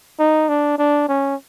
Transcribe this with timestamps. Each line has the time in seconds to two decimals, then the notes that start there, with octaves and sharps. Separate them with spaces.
0.19 D#4
0.49 D4
0.78 D4
1.08 C#4